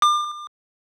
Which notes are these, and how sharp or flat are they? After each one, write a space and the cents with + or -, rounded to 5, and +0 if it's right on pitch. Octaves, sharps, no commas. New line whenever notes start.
D6 +35